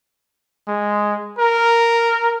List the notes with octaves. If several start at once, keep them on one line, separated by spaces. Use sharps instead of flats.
G#3
A#4